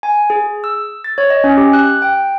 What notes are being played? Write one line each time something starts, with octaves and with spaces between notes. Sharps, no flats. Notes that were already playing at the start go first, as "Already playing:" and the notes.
G#5
G#4
E6
A6
C#5
D#5
C#4
G4
F#6
G5